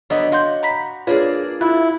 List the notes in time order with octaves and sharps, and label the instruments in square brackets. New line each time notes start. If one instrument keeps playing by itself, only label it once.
[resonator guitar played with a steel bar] D3 F#3 B3 [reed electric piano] C#5 D#5
[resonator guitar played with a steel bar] F#4 [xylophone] F5 C6 G6
[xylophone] A#5 B5 B6
[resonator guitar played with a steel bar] A#3 D4 G#4 [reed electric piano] F4 B4 [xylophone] C#5
[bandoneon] E4 [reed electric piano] F4 [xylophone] E5 F#6